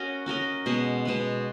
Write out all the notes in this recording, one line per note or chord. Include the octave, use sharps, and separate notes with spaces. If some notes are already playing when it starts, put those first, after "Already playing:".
Already playing: C#4 F#4 A#4 D#5
C#4 F#4 A#4 D#5
B2 G#3 B3
B2 G#3 B3